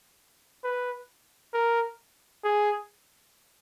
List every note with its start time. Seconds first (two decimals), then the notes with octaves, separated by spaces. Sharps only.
0.64 B4
1.54 A#4
2.44 G#4